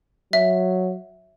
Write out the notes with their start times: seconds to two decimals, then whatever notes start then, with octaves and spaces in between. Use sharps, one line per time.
0.33 F#3 E5